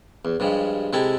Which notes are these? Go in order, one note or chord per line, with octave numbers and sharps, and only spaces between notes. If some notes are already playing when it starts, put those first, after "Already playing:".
E2
G2 F3 G3 G#3
C3 G#3 E4 A4 G5 G#5